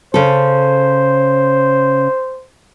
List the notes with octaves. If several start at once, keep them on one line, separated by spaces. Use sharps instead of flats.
C#3 A4 C5